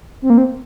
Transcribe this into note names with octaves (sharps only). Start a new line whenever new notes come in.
C4
A#3
C4